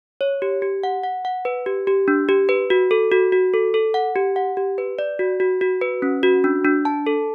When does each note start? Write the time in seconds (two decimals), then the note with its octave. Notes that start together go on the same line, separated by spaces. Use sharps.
0.21 C#5
0.42 G4
0.62 G4
0.83 F#5
1.04 F#5
1.25 F#5
1.45 B4
1.66 G4
1.87 G4
2.08 D4
2.29 G4
2.49 B4
2.70 F#4
2.91 A4
3.12 F#4
3.32 F#4
3.54 A4
3.74 A4
3.94 F#5
4.16 G4
4.36 F#5
4.57 G4
4.78 B4
4.99 D5
5.19 F#4
5.40 F#4
5.61 F#4
5.81 B4
6.02 C#4
6.23 F#4
6.44 D4
6.65 D4
6.85 A5
7.07 A4